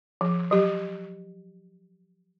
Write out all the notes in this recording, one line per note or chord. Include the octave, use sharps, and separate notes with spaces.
F3
F#3 G4